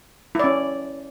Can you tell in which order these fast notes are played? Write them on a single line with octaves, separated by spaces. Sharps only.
E4 D5 C#4